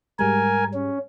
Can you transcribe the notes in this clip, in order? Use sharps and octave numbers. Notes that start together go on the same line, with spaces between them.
G#2 G3 G#3 A#4 G#5
C#4